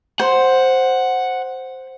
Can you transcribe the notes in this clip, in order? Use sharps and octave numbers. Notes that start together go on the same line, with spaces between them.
C5 F#5